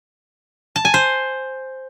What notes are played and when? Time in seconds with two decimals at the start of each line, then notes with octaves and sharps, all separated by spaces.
0.76 A5
0.85 G#5
0.94 C5